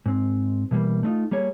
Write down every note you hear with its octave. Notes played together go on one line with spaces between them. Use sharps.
G#2 C4
B2 E3 G3 A#3
A3 C4 D4 D#4 F4
G3 A#3 G#4 C#5